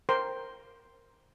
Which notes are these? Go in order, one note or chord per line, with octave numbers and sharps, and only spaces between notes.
A#4 C5 G5 C6